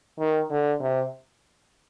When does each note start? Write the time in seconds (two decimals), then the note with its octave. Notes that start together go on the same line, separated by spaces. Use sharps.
0.20 D#3
0.51 D3
0.81 C3